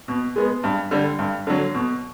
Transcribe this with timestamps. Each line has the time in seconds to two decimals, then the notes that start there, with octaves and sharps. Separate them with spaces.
0.08 B2
0.36 G#3 B3
0.64 G2
0.91 D3 G3
1.19 G2
1.47 D3 F#3
1.74 B2